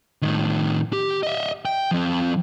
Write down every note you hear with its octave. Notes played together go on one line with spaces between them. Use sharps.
A2 D#3
G4
D#5 E5
G5
F3 C4